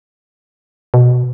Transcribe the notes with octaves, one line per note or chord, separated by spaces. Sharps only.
B2